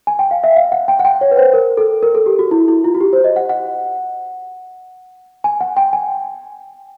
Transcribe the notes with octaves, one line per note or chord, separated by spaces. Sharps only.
G#5
G5
F5
E5
F5
F#5
G5
F#5
G5
C#5
B4
C5
A#4
A4
A#4
A4
G4
F#4
E4
E4
F4
F#4
G4
C5
D#5
F#5
F#5
G#5
F#5
G5
G#5